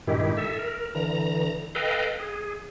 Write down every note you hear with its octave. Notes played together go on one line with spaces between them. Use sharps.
G2 A#2 D#3 G#3 E4 G4
A4 E5
A#4
D3 E3 A#5
A4 B4 D#5 F5 G5
G#4